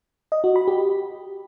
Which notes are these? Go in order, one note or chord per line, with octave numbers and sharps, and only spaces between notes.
D#5
F#4
B5
G4